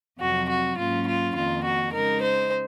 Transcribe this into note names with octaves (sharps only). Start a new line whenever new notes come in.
F2 C3 F#3 C4 F#4
F#4
G#2 F#3 A#3 C#4 F4
F4
F2 D#3 A#3 F4
F#4
C#3 G#3 D#4 A#4
C5